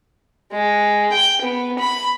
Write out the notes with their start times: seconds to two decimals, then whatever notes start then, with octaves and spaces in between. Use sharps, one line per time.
0.52 G#3
1.12 G5
1.42 B3
1.79 B5